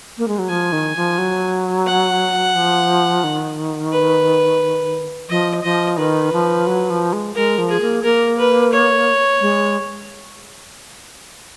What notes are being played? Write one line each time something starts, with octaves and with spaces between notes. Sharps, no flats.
A#3
G#3
F#3
F3 G#5
D#3
F3
F#3
F#5
F3
D#3
B4
F3 D#5
F3 D#5
D#3 B4
F3
F#3
F3
G#3
G#3 A#4
F3
G#4
A#3
A#3 A#4
B4
C#5
G#3